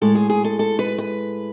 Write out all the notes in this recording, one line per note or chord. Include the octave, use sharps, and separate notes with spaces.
A2 G#3 A4
G#4
G#4
A4
A4
B4
B4